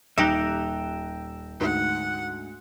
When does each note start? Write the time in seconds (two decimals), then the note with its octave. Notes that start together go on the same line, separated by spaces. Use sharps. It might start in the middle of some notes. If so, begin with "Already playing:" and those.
0.18 D#1 D#4 G4 E5 G5 A#5 F#6
1.60 D2 G#2 F#5